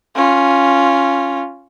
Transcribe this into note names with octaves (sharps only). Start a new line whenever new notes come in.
C#4 F4